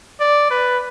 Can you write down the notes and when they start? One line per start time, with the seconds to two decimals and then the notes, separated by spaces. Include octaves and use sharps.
0.20 D5
0.51 B4